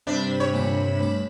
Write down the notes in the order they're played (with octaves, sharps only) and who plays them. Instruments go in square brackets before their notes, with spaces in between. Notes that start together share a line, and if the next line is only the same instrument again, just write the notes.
[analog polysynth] G2 B5 E7 [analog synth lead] C3 [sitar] D4
[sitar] C#5
[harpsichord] D#2 A#2 D6
A1 D6